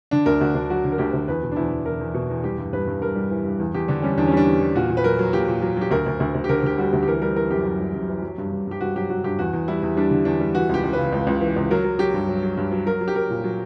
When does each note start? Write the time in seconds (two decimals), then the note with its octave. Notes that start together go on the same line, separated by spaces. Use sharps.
0.11 D3 D4
0.26 D2 A#4
0.41 D2 F#4
0.55 D2 D4
0.70 F#3 F#4
0.84 D3
0.92 A#4
0.98 D2 G4
1.13 D2
1.28 E2 B4
1.43 B2
1.52 D4
1.56 E2 E4
1.71 E2
1.86 E2 A#4
2.00 E2
2.14 B2
2.30 E2
2.44 G3 G4
2.58 G2
2.73 G2 B4
2.87 G2
3.01 G2 A#4
3.16 G3
3.31 E3
3.45 G2
3.59 E2
3.74 E2 G4
3.88 D3 D4
4.02 G3 C#4
4.17 E2 D4
4.27 C#4
4.32 G3 D4
4.47 E2
4.61 E2
4.76 A#2 F#4
4.90 A#2
4.97 B4
5.04 F#3 A#4
5.19 F#3
5.33 A#2 G4
5.48 A#2
5.62 F#3
5.77 F#3 G4
5.91 D2 A#4
6.06 D2
6.20 D2
6.35 D2
6.44 G4
6.49 D3 A#4
6.63 D3 G4
6.78 G3 F#4
6.93 D2
7.03 G4
7.07 E3 A#4
7.21 G3 A#4
7.36 E3 A#4
7.50 F#2 G4
7.66 F#2
7.80 G3
7.94 F#2
8.09 E3
8.23 F#3
8.38 G2
8.52 G2
8.67 G2 G4
8.81 G2 F#4
8.96 F#3 G4
9.10 F#3 F#4
9.24 G2 G4
9.39 E2 F#4
9.53 E2
9.68 G3 E4
9.83 E2
9.97 G3 D4
10.11 D3
10.25 E2 D4
10.40 G3
10.55 E3 F#4
10.69 C#2 G4
10.84 C#2
10.93 C#3 B4
11.13 C#2
11.27 C#2
11.41 E3
11.56 C#2
11.71 F#3 A#4
11.84 F#3
11.99 F#3 G4
12.14 G2
12.29 F#3
12.43 F#3
12.57 G2
12.72 F#3
12.86 F#3 A#4
13.01 F#3
13.08 G4
13.15 F#3 A#4
13.30 A#2
13.44 F#3